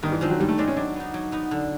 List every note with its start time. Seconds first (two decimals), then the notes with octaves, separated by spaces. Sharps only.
0.03 G2 D#3
0.12 E3
0.21 D#3 F3 G#3 C4
0.30 F#3
0.40 G2 G3
0.49 A3
0.58 D#3 G#3 C4 D4
0.68 C#4
0.76 F#3 D4
0.96 B3 D#4
1.14 F#3
1.32 B3 D#4
1.51 D3